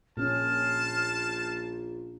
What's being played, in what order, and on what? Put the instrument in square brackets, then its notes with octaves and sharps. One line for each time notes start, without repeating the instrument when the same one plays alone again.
[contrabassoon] A#1 [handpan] A#2 C#4 [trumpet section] C5 A5 [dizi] F6